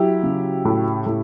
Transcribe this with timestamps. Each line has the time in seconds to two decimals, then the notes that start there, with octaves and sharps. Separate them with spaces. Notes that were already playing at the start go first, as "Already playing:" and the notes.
Already playing: F#3 E4 G4
0.23 C#3
0.65 A2
1.06 A2